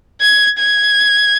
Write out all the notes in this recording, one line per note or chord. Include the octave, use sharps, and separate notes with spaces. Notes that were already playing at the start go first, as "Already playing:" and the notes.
G#6
G#6